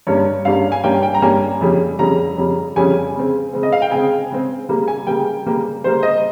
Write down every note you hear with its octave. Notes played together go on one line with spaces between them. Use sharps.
G2 G3 A#3 C#4 C#5
G2 G3 A#3 C#4 F5
G#5
G2 G3 A#3 C#4 G5
G5
A#5
G2 G3 A#3 C#4 G#5
F2 C#3 G3 C#4
F2 C#3 G3 C#4 A#5
F2 C#3 G3 C#4
F2 C#3 G3 C#4 G#5
C#3 G#3 C4
C#3 G#3 C4
D#5
F5
G5
C#3 G#3 C4 G#5
C#3 G#3 C4
C#3 G3 A#3
G#5
C#3 G3 A#3 G5
C#3 G3 A#3
C#3 G3 A#3 C5
D#5